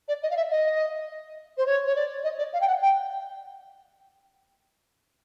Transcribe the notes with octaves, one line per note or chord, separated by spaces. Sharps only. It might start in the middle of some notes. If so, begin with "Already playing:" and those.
D5
D#5
F5
E5
D#5
C5
C#5
C#5
D5
D#5
D5
F5
G5
F#5
G5